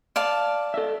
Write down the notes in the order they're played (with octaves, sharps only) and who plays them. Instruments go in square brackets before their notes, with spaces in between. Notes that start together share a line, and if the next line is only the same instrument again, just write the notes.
[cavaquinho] D5 F5 A5
[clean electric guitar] A4 D#5 E5